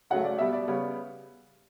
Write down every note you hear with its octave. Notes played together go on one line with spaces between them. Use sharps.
C#3 F#3 A3 F#5
D5
B2 G3 B3 E5
D5
C#3 G3 B3 C#5